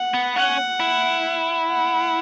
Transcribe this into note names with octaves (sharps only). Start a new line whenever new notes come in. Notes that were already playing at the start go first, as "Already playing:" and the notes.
Already playing: F#5
B3
C#4 F#5
E4
F#5